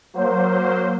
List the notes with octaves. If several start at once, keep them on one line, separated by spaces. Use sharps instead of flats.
F#3 A#3 C5